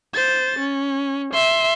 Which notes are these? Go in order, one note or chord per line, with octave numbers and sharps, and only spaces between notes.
C5 A6
C#4
E5 C6